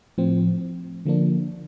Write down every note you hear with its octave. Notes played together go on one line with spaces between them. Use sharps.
A2 F3 C4
D3 F3 A#3 D4